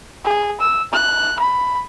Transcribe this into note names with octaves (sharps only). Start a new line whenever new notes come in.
G#4
E6
F#6
B5